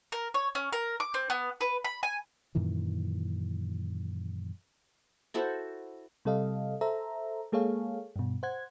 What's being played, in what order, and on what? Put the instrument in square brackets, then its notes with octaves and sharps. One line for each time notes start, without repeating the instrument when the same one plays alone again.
[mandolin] A#4
C#5
C#4
A#4
D6
C4
B3
B4
B5
G#5
[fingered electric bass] F#2 A#2 D#3 E3
[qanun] E4 F#4 A4 C5
[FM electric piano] C3 G3 A4 D#5 F5
A4 C5 E5 A#5
G#3 A#3 G#4 A4 C#5 F5
G2 B2
C5 F#5 G#6